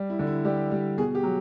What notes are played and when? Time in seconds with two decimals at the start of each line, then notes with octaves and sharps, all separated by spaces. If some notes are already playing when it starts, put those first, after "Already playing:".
Already playing: G3
0.10 E4
0.19 D3
0.27 E4
0.45 G3 G4
0.71 G3
0.98 B2 G#4
1.15 G4
1.23 F#3